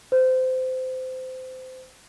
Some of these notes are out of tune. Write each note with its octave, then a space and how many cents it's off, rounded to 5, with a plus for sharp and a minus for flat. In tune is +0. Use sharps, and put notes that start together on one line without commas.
C5 -25